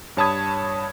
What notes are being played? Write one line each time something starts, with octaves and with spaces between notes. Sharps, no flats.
G2 C#5 A5 B5 D#6 G#6